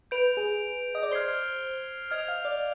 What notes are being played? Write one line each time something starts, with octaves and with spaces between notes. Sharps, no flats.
B4 G6 D7 F7
G#4
D#5
D5
C5 F6 G#6 C7 G7
D#5 F6 G#6 D7 F7
F5
D5